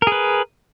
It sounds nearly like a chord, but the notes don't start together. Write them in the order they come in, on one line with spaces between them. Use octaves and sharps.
A#4 G#4 B4